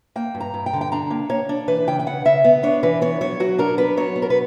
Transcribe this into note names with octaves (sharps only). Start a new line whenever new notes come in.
A#3 G5
G2
A#5
G2
G5
D3
G5
D4 A#5
A#3
A#3 C#5
D4
E3 B4
C#3 G5
G5
C#3 F#5
C#3 E5
B3
D4 C#5
E3 B4
B3 C#5
F#3 C#5
F#3 F#4
D4 A#4
B3 B4
F#3 C#5
B3
A#4
B4